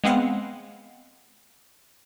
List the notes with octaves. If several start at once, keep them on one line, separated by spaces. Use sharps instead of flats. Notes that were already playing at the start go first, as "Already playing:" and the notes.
G#3 B3 C4 F5 F#5